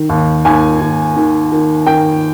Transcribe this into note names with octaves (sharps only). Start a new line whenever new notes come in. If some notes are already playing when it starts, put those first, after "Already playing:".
Already playing: D#3
D#2
D#2 G#5
D#2
D#3
D#3
D#3 G5